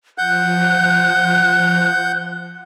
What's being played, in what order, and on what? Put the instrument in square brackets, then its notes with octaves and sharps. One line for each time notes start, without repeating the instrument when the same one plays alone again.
[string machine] F3 [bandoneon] F#5 G6 [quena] F#6